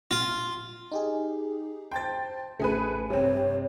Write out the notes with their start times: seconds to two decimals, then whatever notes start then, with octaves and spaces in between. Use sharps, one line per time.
0.11 F4
0.92 D#4 G4 G#4
1.91 C5 G5 A5 C6 A6
2.60 A1 C#3 A3 G#4 B4
3.10 G2 C3 C4 C#5